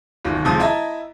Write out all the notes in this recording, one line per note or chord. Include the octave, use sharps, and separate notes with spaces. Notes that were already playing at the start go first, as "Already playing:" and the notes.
D1 B1 D#3
D#1 C3 F3 G#3 D#6
E4 D#5 E5 A5 A#5